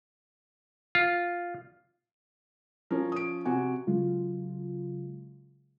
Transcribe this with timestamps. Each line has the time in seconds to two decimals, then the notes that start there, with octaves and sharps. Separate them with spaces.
0.95 F4
2.91 F3 C#4 A#4
3.12 D#6 D7
3.45 C3 F#4 G#5
3.87 C#3 F#3 G#3 F4